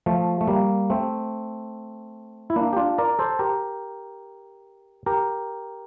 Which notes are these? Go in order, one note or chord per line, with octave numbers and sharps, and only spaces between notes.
F3 A3
A3
G3 A#3
A3 C4
E4
A#3 D4
G4
D4 F4
A#4 D5
A4 C5
G4 A#4
G4 A#4